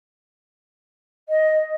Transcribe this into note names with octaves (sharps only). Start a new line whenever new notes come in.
D#5